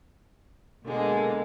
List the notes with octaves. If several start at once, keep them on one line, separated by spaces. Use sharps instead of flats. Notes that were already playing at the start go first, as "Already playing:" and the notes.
B2 D3 G#3 A#3